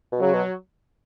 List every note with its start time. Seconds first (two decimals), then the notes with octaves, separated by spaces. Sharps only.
0.12 B2
0.20 C#3 F#3
0.33 B2